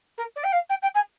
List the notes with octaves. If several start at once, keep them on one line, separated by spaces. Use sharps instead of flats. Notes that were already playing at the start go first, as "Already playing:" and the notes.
A#4
D5
G5
F5
G5
G5
G#5